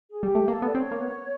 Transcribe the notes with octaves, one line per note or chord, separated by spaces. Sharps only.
G#4
G3 G4
A3
A#3 A4
B3
D5
C4 C#5
A#3
B3